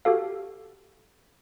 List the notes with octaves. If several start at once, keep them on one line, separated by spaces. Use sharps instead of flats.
F#4 G4 A4 F5